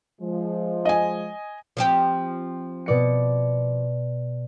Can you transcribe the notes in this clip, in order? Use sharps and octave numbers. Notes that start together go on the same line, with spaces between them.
F3 G#3
D#5 G#5
F3 C4 G4
B2 D5 C#7